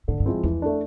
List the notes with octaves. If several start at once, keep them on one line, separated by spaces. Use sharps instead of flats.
A2 D3
G2
F3 G#3 C4 E4
E2 E3
A3 D4